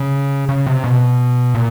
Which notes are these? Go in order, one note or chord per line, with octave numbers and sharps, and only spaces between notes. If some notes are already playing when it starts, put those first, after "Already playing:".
Already playing: C#3
C#3
C3
B2
A#2